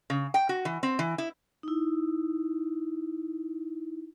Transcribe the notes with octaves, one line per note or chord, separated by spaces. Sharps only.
C#3
G5
F#4
E3
C4
E3
E4
D#4 E4